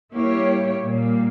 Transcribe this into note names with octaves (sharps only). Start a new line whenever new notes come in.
G3 A#3 E4 G4 C#5
A#2 G3 A#3